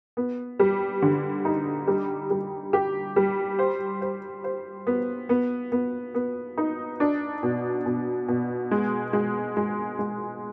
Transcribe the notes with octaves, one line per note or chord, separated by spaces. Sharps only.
B3
G3
D3
D#4
G3
G3
G4
G3
C5
C5
C5
B3
B3
B3
B3
D#4
D4
B2
B2
B2
G#3
G#3
G#3
G#3